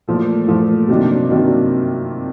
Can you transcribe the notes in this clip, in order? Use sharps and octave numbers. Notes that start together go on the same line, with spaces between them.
A#2 F3 A3
A#2 F3 A3
C3 D#3 F#3 A#3 D4
C3 D#3 F#3 A#3 D4